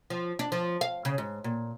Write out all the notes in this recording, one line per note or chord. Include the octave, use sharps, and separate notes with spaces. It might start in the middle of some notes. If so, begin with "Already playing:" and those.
F3
D4
F3
F5
C#3
G#2
A#2